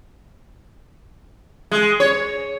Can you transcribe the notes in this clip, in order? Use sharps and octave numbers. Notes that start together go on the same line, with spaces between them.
G#3
C#5